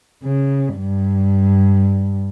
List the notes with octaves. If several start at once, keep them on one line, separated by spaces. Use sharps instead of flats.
C#3
G2